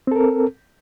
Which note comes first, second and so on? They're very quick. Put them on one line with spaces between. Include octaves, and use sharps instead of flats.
C4 A4 A#4